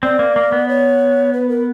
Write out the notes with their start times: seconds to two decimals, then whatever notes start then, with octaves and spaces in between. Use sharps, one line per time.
0.03 C4 D5
0.19 A#3
0.36 A#3
0.52 B3
0.68 C#5
1.33 B4
1.48 A#4